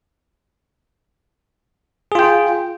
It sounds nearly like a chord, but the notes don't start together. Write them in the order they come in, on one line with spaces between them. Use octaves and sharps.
G#4 F4 G5